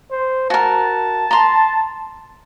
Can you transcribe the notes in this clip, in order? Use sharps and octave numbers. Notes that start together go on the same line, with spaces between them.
C5
F#4 A#4 A5
A#5 C6